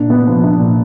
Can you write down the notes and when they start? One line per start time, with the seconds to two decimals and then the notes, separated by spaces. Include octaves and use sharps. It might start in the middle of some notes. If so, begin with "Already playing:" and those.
Already playing: A#2 D4
0.10 B3
0.27 F3
0.44 D4
0.60 A#2